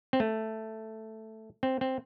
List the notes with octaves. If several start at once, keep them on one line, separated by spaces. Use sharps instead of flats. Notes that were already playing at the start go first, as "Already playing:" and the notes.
C4
A3
C4
C4